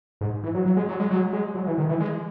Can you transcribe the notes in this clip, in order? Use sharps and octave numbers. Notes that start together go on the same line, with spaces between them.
G#2
E3
F#3
F#3
G#3
F#3
G#3
F#3
G#3
F#3
E3
D#3
E3
G#3